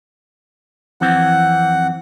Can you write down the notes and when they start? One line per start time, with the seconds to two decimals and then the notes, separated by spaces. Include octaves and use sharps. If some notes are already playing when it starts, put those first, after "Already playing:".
1.01 F2 E3 C4 F#5